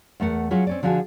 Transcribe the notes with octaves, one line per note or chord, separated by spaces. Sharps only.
E2 A3 A#4 F#5
F#3 C#4 F4 G#4 E5
C4 C#4 D5
D3 F3 D4 F#4 G#4